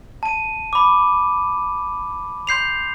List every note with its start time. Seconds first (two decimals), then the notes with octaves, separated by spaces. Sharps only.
0.23 A5 D#7
0.73 B5 D6
2.47 C6 G6 C7 F7